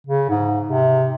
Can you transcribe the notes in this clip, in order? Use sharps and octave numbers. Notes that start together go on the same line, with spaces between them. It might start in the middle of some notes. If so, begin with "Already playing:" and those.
C#3
G#2
C3